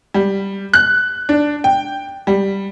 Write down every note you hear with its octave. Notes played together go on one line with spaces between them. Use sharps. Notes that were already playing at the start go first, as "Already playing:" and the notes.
G3
F#6
D4
G5
G3